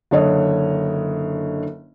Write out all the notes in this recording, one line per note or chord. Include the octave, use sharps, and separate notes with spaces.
F#1 D3 C#5 D#5